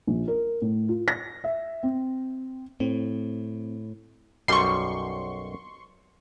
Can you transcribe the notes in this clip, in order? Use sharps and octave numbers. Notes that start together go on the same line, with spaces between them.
A#1
A#4
A2
F4
A#6
E5
C4
A2 C4
B1 F#2 G3 C6 C#6